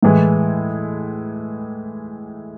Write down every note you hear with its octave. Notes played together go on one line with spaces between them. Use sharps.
A2 E3 G#3